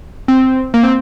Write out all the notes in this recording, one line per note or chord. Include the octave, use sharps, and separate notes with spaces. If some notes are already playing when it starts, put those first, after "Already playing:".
C4
A#3
C4